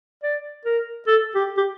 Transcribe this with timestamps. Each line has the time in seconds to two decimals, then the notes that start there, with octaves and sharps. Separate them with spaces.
0.23 D5
0.65 A#4
1.07 A4
1.35 G4
1.57 G4